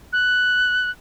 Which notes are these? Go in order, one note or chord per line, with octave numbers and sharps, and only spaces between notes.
F#6